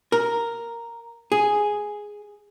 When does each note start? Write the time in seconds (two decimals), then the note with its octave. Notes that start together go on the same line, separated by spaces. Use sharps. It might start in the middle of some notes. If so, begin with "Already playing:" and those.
0.12 A#4
1.32 G#4